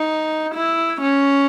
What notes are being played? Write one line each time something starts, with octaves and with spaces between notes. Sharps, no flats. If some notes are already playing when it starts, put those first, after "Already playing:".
Already playing: D#4
E4
C#4